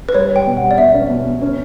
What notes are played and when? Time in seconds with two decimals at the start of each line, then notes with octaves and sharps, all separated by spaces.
0.09 B4
0.14 G3 C#5
0.30 G3
0.36 G5
0.47 B2
0.57 G3 F#5
0.71 D5
0.78 B2 E5
0.94 C#4
1.10 B2
1.26 B2
1.42 C#4